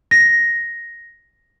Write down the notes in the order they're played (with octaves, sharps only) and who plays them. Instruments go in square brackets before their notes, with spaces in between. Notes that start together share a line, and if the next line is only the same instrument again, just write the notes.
[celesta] A#6